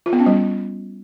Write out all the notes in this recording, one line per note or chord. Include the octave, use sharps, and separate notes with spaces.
F4
B3
C#4
G3